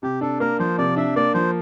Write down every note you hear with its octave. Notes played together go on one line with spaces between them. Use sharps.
C3 G4
D4 A4
A#3 A#4
F3 C5
C3 D5
D4 E5
A#3 D5
F3 C5